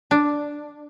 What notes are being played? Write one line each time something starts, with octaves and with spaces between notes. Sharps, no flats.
D4